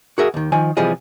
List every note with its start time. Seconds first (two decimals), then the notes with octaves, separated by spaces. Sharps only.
0.18 F#4 G#4 A#4 E5
0.34 D#2 D#3
0.52 D#3 F3 G#5
0.77 C3 E3 F3 G3 G#4 D#5